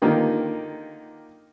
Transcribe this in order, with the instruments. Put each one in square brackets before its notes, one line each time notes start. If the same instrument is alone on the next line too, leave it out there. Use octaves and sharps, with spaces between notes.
[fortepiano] D3 D#3 A#3 D#4 F4 G4